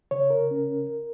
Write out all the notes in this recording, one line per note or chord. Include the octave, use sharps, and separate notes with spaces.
C#3 C#5
A#4
C#4